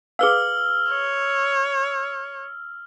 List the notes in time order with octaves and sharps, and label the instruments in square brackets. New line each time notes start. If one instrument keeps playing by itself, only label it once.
[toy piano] G#4 B4 F5 [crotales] E6 F6 G7
[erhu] C#5